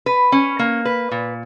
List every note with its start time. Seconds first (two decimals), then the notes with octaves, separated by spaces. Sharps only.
0.06 B4
0.32 C#4
0.59 A#3
0.85 B4
1.11 A#2